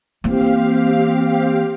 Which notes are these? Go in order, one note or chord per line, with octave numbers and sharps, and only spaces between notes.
E3 A#3 C4 G4 F5